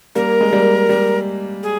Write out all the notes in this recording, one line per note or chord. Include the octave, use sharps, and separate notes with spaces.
G3 A#3 A#4
G#3
G3 A#3
G3
G#4